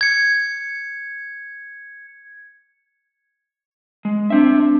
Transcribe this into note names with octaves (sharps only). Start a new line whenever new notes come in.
G#6 C#7
G#3
C4 D4 E5